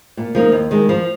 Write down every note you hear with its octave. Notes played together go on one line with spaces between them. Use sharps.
A#2
F3 A#3 D#4
D#2
D#3 G#3
F3